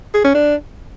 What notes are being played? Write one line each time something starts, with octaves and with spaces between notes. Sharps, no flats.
G#4
C#4
D4